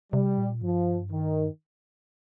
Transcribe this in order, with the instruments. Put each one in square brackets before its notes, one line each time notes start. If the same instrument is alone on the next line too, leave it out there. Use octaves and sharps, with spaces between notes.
[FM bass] C3 [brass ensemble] G3
[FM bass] A#2
[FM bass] G2 [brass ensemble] F3
[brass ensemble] D#3